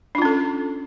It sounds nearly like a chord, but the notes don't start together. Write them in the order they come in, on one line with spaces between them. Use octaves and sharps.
D4 F4 C#4 A4